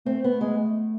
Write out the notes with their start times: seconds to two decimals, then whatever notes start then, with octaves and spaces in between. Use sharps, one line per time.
0.05 A3 C4
0.24 B3
0.41 G#3